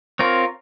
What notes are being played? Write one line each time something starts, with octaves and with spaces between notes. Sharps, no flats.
C4 F4 A#4 C#5